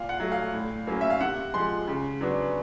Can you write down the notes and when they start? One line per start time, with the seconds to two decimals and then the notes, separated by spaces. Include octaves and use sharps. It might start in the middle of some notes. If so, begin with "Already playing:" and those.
Already playing: A#2 F5
0.09 F#5
0.20 F#3 A3
0.32 F5
0.54 A2
0.87 F#3 A#3 C#4
1.01 E5
1.10 F5
1.21 C3 F#5
1.54 F3 G#3 C6
1.88 C#3
2.21 F#3 B3 D4